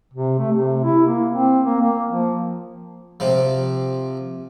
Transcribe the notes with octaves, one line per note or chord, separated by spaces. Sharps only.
C3
A3
C3
E4
A#3
C4
A#3
A#3
F3
C3 F3